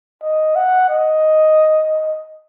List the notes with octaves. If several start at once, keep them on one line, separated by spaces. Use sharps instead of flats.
D#5
F#5
D#5